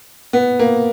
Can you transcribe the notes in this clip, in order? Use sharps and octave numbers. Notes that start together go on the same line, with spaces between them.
B3
A#3